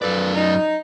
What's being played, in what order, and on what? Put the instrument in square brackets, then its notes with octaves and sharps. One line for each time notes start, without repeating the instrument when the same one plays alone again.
[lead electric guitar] F#2 D5 [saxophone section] F3 A4 B4
[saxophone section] D#4